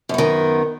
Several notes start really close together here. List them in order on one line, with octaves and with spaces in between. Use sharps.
F#2 B3 D#3